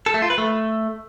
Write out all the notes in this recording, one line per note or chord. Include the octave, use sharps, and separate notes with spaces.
A4
A3
F4
B4
A3